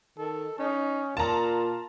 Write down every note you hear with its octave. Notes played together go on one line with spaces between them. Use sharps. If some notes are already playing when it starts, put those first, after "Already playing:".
D#3 A4
C#4 D#4
A#2 F4 A5 A#5